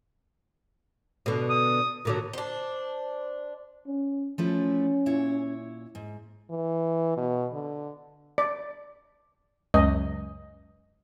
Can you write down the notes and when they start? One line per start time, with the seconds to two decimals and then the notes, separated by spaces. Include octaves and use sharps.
1.26 B2 D3
1.49 D#6
2.05 A#2 D3 F#3
2.33 D4 C5
3.87 C#4
4.38 F3 A3 C#4 E4
5.06 A#2 E4 C#5
5.95 G#2
6.50 E3
7.17 B2
7.53 D3
8.38 D5
9.74 C#2 F#2 D#5